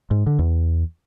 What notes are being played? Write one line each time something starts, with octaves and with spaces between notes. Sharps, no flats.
G#2
D3
E2